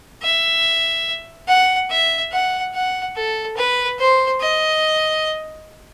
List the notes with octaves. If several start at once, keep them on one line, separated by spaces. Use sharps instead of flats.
E5
F#5
E5
F#5
F#5
A4
B4
C5
D#5